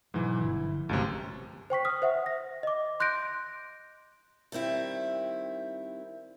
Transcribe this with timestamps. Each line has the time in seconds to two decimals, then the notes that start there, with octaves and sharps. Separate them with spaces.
0.14 G#2 B2 E3 F#3 G#3
0.41 G1 D3 F3 E4
0.89 G1 C#2 F#2 C3 A3
1.70 C5 G5 C#6 B6
1.85 D#6 F6
2.02 C5 E5 F#5
2.26 A#6
2.63 D#5 D6
3.00 C6 F#6 G6 A#6 D7
4.52 D#3 G3 C4 E4